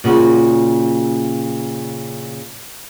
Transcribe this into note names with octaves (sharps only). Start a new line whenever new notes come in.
A#2 C#3 F#4